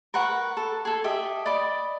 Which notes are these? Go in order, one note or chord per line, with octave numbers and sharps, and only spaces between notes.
A#4 B4 F#5 C#6
A4
G#4 A4
G4 D#5 E5
D5 D#5 B5 D6